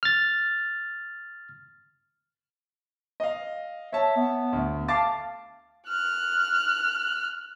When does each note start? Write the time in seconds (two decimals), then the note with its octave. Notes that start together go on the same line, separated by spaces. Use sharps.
0.03 F6 A6
3.20 D#5 F5
3.92 C#5 E5 A5
4.16 B3
4.52 D2
4.88 F5 A5 D6 A6
5.88 F6 F#6